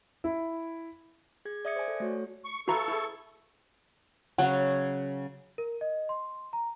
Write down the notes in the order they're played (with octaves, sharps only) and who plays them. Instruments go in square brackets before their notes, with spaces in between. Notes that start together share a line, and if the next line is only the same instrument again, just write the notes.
[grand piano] E4
[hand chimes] G#4 G#6
D5 E5 D#6 G#6 C#7
C5 D5 G#5
A4
A3 F#4 C#5
[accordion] C#6
[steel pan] E4 B4 F5 [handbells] F#4 A#5 [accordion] A4 C#6
[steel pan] E4 G#4
[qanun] C#3 F#3 [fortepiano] F#5
[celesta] A#4
D#5
C6
A#5